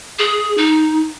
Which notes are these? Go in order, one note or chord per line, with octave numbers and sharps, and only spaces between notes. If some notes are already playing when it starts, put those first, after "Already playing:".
G#4
D#4